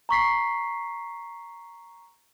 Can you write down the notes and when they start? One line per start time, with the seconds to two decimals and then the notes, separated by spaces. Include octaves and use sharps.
0.09 A#5 C#6 B6 C7